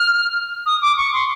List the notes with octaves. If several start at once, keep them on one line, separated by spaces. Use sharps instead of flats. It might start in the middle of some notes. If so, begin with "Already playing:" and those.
Already playing: F6
D#6
D6
C#6
C6